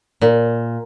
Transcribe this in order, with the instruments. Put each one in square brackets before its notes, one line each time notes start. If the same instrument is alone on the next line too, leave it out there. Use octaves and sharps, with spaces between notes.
[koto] A#2